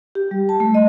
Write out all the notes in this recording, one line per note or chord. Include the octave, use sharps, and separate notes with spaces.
G4
G3
A5
A3
D#5